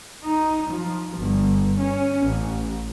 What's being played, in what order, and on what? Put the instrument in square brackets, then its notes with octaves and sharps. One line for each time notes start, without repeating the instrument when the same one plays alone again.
[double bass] D#4
F3
G1
C#4
A1